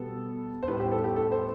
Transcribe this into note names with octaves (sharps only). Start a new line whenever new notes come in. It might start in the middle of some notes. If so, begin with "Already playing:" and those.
Already playing: B2 G3 B3 A4
C5
A2 G3 B3 B4
G4
A4
G4
A4
C5